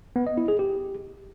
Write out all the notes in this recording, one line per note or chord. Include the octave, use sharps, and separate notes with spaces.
B3
D#5
E4
G#4
G4